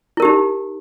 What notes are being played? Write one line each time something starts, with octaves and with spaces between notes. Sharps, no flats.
D#4 E4 G4 A#4